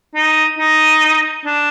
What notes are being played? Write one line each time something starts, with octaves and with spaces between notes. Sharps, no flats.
D#4
D#4
D4